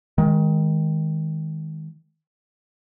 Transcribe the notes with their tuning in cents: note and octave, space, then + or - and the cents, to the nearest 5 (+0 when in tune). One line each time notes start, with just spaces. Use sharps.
D#3 +25 G#3 +0